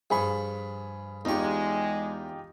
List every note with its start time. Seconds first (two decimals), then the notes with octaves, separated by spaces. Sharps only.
0.10 G2 F3 G#4 B5 C#6
1.25 E2 G#3 D#4 F4 G4 C#6